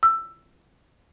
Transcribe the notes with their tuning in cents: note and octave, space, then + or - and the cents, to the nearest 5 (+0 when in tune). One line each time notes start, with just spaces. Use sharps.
E6 +15